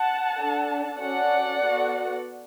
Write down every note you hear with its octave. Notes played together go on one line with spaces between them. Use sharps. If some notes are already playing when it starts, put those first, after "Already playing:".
Already playing: F#5 A5
D4 A4
C#4 F#4 A4 D5 F#5
B3 F#4 A4